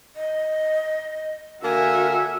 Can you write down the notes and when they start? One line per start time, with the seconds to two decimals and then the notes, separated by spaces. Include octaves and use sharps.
0.16 D#5
1.63 D3 A#3 F#4 A#4 E5 G#5